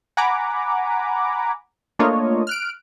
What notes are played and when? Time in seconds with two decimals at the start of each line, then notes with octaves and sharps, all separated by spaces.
0.17 F#5 G#5 A#5 B5 D6
1.99 A3 A#3 D4 F4 C#5 D#5
2.47 F6 F#6 D7